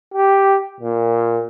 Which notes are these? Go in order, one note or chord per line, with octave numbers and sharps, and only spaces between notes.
G4
A#2